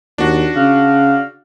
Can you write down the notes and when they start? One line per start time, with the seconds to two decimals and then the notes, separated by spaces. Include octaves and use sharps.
0.18 D#2 D4 F#4
0.56 C#3 F5